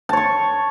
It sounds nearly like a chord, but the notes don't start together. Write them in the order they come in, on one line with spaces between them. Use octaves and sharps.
A5 C#5 C#6